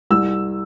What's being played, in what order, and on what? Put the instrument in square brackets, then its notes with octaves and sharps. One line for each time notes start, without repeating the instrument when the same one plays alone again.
[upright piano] C2 E6